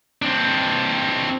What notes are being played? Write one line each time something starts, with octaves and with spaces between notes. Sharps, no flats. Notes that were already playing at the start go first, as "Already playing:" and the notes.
C4 D4